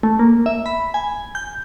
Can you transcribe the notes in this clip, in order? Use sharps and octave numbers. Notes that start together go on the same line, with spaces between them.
A3
A#3
E5
B5
G#5
G6